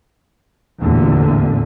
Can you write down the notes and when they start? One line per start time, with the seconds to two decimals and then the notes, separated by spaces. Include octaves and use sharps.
0.81 A1 E2 A#2 D3